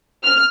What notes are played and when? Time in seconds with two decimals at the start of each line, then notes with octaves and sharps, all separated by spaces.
0.24 F6